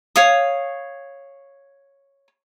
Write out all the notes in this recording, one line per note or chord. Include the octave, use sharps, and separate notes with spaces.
C#5 F5 D#6